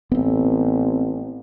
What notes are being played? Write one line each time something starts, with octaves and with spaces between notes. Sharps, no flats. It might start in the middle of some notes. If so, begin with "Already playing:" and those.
A1 B3 C4